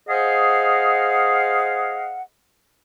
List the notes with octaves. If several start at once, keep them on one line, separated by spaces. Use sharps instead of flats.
G#4 C5 D#5 F5 F#5